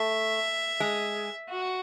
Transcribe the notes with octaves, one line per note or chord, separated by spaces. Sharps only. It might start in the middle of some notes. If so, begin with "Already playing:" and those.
Already playing: A3 E5
G#3
F#4